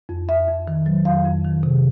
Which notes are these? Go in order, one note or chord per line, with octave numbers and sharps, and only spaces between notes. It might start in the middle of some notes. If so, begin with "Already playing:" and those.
F2
F2 E5
F2
D#3
F#3
F2 F5
F2
D#3
C3